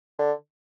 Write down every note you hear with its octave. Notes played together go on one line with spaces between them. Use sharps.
D3